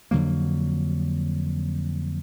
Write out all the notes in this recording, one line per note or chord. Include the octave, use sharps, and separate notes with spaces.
F2 D3 F#3 A#3